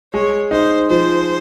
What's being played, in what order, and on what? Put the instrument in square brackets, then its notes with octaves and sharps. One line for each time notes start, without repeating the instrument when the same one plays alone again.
[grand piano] G#3 [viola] C#5
[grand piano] D#4 [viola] C5
[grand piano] F3 [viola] C5